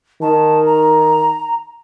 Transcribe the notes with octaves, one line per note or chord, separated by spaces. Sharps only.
D#3 A5
A#5